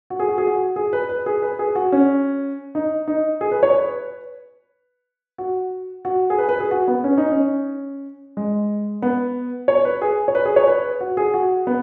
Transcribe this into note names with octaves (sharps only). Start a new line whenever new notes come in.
F#4
G#4
F#4
G#4
F#4
G#4
B4
B4
G#4
B4
G#4
F#4
C#4
D#4
D#4
G#4
B4
C#5
B4
F#4
F#4
G#4
B4
B4
G#4
F#4
B3
C#4
D#4
C#4
G#3
B3
C#5
B4
G#4
C#5
B4
G#4
C#5
B4
F#4
G#4
F#4
B3